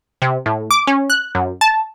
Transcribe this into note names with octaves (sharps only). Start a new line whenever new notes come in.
C3
A2
D6
C#4
F#6
F#2
A5